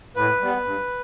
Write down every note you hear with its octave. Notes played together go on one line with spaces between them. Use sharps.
A2 B4
G3 B3
G2